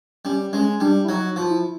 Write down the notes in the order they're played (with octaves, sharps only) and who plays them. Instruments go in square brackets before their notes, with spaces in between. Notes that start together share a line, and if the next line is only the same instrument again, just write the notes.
[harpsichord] G3 [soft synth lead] C#4
[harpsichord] G#3 [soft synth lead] C#4
[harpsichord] G3 [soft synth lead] D4
[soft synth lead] E4
[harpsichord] F#3 [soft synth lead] D#4
[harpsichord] F3
[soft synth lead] E4